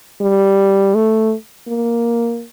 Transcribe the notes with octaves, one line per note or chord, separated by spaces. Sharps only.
G3
A3
A#3